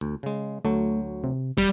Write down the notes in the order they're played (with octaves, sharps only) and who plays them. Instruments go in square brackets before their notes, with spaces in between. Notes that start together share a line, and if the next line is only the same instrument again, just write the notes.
[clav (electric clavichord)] D2
C#3 G#3
[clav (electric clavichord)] D2 F#3 [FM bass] A3
[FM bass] C3
[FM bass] E1 [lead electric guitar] G3